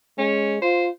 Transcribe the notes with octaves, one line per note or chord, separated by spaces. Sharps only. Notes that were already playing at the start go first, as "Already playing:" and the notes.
G#3 C#4
F4 C5